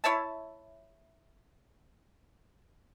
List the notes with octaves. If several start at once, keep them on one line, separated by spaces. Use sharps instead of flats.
E4 C#5 E5 A5